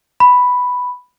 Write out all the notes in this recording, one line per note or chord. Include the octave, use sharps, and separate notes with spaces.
B5